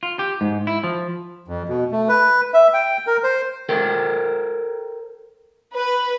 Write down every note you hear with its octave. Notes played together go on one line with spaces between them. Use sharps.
F4
G4
G#2
E4
F3
F2
B2
A3
B4
E5
G5
A#4
C5
A4 A#4 C5 G5
B4